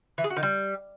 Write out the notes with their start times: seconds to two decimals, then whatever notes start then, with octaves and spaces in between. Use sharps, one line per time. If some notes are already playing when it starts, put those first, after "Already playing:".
0.18 E3
0.24 G#4
0.30 F#4
0.37 D#3
0.43 G3